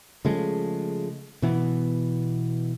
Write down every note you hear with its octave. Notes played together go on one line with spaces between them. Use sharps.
C#3 F3 G#3 A3
B2 E3 B3